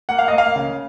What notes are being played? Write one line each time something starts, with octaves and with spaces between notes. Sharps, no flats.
A#3 F#5
F5
A#3 D#5
F5
C#3